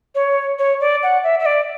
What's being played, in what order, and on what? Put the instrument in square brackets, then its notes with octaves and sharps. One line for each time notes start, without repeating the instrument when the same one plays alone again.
[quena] C#5
C#5
D5
F#5
E5
E5
D5